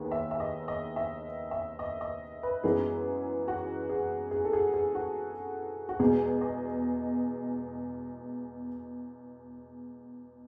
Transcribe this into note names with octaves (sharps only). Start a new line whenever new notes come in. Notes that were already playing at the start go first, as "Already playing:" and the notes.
Already playing: D#2 D#3 B3 G#4
E5
E5
D#5
D#5
E5
E5
D#5
D#5
B4
F#2 E3 G#3 B3 G#4
F#4
G#4
G#4
A4
G#4
G#4
F#4
F#4
E2 B2 G#3 G#4
D#5